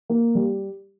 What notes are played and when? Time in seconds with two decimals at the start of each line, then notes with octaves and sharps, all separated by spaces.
0.10 A#3
0.35 G3